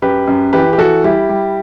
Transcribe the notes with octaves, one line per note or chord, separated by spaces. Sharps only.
F#2 G4 B4
F#2
E3 G4 B4
G4
E3 F#4 A4
G3 E4 G4
G3